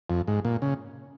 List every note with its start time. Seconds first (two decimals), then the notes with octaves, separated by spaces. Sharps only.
0.10 F2
0.27 G#2
0.45 A#2
0.62 C#3